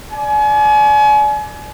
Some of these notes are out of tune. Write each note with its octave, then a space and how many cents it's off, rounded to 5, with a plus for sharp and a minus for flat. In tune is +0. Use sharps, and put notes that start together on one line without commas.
D5 +0 G#5 +35